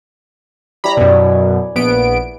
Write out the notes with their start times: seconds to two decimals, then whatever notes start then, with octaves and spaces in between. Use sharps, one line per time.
0.84 G3 E4 C#5 A#5 B5
0.97 F#2 B2 D5 G#5
1.75 A#1 B3 D7